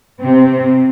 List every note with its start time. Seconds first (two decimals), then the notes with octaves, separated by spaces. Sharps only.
0.21 C3 C4